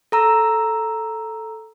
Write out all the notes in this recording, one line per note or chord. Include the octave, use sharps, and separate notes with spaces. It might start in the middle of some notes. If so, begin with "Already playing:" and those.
A4 A#5 E6